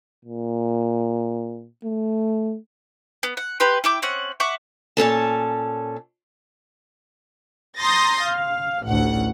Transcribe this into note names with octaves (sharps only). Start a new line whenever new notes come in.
A#2
A3
B3
F#5
G4 B4 C6
E4 G5 D6
C4 C#4 F#5
E5 F#5 C#6 D6
A#2 C#4 A4 A5
A#5 C6 D#6 G6 A6 A#6
F5
A1 D2 F#5